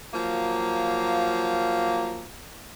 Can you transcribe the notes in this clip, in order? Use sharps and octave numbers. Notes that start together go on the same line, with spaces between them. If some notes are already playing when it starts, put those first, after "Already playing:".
F3 F#3 A#3